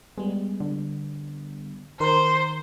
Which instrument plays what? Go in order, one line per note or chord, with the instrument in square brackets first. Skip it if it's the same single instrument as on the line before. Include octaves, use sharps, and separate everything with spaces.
[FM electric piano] G3 B3 [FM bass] G#3
[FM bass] D3
[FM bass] D#3 [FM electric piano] A#4 C6 C7 [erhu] C5